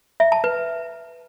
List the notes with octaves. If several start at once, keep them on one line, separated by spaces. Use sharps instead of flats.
E5
A5
B4